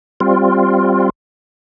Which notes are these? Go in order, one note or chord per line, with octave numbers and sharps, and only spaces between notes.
G3 C4 F4